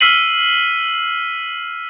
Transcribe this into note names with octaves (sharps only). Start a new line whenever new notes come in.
E6 F6 B6 C7 D#7 F#7